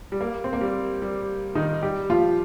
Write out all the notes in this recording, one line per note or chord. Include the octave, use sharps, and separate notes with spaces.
G3
A#3
C4
A#3
G3
G3
D#3 D#4
G3 G4
F3 F4